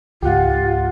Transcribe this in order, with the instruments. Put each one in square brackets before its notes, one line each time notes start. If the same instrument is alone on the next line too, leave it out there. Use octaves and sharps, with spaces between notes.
[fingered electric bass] C#2 G#2 [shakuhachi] F4 [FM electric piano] G4 F#5